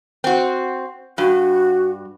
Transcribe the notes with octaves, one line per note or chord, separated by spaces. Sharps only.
C4 F#4
G2 F#4